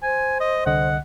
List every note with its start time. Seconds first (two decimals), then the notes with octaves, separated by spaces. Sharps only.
0.03 C5 G#5
0.40 D#5
0.66 C2 D3 D#5 F#5